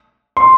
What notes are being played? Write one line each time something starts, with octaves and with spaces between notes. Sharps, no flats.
C6